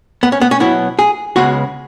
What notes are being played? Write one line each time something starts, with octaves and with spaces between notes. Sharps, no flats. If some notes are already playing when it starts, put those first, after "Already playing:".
B3
C#4
B3
C#4
B2 F#3 B3 E4
G#4
C#2 C#3 G#3 B3 F#4